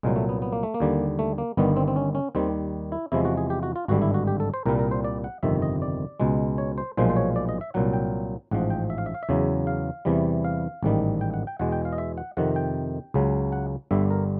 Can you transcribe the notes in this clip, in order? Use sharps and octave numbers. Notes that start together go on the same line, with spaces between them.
C2 A#2 F#3 G#3
A3
B3
B3
A#3
A3
A#3
D#2 D3 G3
A3
A#3
G1 G2 D#3 G3 B3
C4
C4
C#4
C#4
D#2 D#3 G3 C4
E4
E2 C3 F3 G#3 E4
F#4
G#4
G4
F#4
F4
G#1 G2 D3 G3 F#4
E4
F#4
G4
A4
C5
C2 A#2 G3 A#4
A#4
C5
D5
F#5
G1 F2 C3 D#3 E5
D#5
D5
C#2 B2 G#3
C#5
C5
B1 A#2 F3 G#3 C5
C5
C#5
D5
D#5
E5
C2 A#2 F#3 F#5
G5
A1 G#2 F3 F#5
G5
E5
F5
E5
F5
E5
E2 C#3 F#3
F5
E2 C3 E3 G3
F5
A1 G#2 D#3 G3
G5
F#5
G5
E2 B2 G#3 F#5
G5
F5
D#5
E5
F#5
F2 C3 D#3 F#5
G5
C#2 C#3 F#3
F#5
G1 G2 D3 G3 E5
A#4